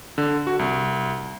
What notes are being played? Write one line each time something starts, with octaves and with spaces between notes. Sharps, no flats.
D3
F#4
C2